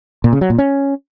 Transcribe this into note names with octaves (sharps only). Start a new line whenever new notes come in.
A#2
C#3
F#3
A#2
C#4